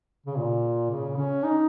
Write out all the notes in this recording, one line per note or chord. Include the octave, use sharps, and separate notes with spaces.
C#3
A#2
C#3
C#4
D#4